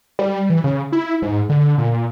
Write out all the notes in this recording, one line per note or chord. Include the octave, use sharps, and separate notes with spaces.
G3
E3
C#3
E4
G#2
D3
A#2